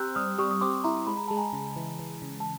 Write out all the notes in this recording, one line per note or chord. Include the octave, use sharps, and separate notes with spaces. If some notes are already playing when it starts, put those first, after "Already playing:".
Already playing: C4 G4 A#5 C6 E6 F#6 G6
G3 D#6 F6
G3 C#6 D#6
D#6
C4 C6 D6
E4 A#5 C6
G#3 B5
A#5
G#3 A5
G#5 A#5
C#3
E3
E3
C#3
A5